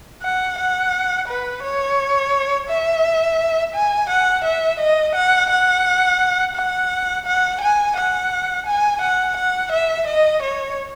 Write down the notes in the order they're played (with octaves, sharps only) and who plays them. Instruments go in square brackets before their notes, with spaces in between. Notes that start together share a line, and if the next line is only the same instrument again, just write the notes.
[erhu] F#5
F#5
B4
C#5
E5
G#5
F#5
E5
D#5
F#5
F#5
F#5
F#5
G#5
F#5
G#5
F#5
F#5
E5
D#5
C#5